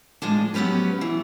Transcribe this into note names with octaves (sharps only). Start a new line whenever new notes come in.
A2 F3 G#3 D4
F#3 B3 C#4 G4 B4
E3